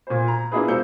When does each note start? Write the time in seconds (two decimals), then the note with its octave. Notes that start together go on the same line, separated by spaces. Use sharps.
0.07 A#2 C5
0.28 A#5
0.51 A#3 D4 E4 F4 G#4 B4
0.68 G#3 A#3 C5 E6 G6 C#7